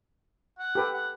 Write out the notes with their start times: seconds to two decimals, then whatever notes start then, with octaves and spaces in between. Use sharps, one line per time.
0.59 F#5
0.75 G4 A4 B4
0.94 F#5